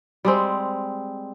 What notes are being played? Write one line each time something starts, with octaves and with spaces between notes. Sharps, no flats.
G3 G#3 C4